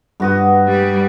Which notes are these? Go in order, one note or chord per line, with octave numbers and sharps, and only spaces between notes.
G2 B3 F#4 D#6
G3